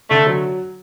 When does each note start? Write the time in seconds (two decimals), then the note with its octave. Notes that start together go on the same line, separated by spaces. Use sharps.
0.11 D3 A3
0.27 F#3